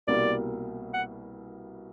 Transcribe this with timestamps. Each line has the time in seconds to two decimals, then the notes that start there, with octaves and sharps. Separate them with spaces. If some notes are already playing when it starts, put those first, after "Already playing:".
0.07 C2 B2 G3 A#3 D5
0.94 F#5